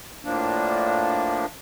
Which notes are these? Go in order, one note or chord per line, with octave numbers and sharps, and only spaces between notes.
A2 F3 A#3 D4